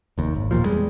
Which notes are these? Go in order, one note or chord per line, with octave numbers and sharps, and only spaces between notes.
F1 D#2
G#1
E1 D#2 A#2 F3
E2 G3 G#3